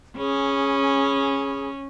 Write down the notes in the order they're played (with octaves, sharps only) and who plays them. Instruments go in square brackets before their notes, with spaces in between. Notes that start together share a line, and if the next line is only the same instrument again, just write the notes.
[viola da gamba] C#4 [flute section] G#4 B5